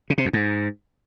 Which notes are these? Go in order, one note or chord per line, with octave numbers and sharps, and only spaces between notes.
C#3
C3
F2
G#2